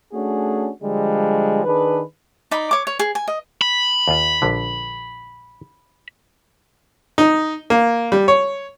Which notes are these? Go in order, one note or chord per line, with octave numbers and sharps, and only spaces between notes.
A3 C#4 D4 F#4 G#4
D3 F3 G3 G#3
D#3 D4 G#4 B4
D#4 D5 B5
C#5 D6
C#5
G#4
G#5
D#5
B5
D#2 F4
A#1 D3
D#4
A#3
G3
C#5